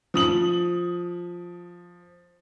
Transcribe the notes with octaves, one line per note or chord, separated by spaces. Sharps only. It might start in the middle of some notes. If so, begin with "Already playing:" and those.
F3 D#6 F#7